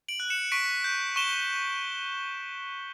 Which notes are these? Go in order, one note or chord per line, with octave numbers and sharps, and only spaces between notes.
D7 F#7
F#6
C#7 E7
C#6 B6 D7
G6
C#6 E7 G7